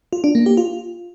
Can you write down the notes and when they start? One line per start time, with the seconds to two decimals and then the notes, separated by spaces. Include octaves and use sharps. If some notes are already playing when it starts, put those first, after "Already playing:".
0.13 F4
0.24 D4
0.35 A#3
0.46 G4
0.57 F4